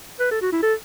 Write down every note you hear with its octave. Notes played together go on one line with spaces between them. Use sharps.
B4
A4
F#4
E4
A4